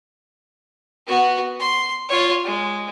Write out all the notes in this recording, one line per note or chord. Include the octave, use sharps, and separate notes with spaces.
B3 F#4
C6
F4 C#5
G#3